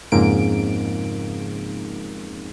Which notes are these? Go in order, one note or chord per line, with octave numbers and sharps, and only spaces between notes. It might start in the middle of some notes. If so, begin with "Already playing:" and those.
F2 G#2 C#3 A#3 D7